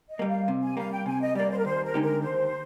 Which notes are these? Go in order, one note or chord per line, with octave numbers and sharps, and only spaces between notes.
D#5
G3 A#3
F5
C3
G#5
G3 A#3 F5
G5
C3 G#5
D#5
G3 A#3 D5
C5
A#4
D#2 C5
A#4
D3 G#3 D#4 G4
A#4
D#2 C5